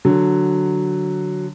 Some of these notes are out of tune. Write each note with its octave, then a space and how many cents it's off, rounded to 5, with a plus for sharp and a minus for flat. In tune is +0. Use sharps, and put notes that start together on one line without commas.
D3 +0 F#3 +0